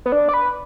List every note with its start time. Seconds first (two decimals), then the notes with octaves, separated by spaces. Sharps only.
0.06 B3
0.12 D4
0.29 D5
0.34 B4